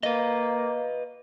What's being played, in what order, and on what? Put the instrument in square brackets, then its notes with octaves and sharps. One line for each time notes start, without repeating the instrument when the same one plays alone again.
[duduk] A#3 [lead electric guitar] B4 D#5